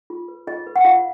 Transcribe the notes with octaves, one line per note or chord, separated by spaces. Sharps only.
F4
B4
F4 D#5
B4
F#5
F4 F5